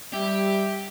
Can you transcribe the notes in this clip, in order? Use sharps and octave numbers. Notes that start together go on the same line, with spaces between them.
G3 G4 E5